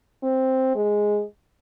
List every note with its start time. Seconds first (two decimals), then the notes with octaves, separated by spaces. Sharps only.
0.23 C4
0.76 G#3